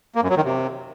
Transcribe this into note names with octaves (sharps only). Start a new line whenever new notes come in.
A#3
F#2
F#3
D#3
C3